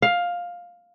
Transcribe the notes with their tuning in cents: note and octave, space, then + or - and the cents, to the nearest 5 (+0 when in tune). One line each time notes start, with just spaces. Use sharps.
F5 +10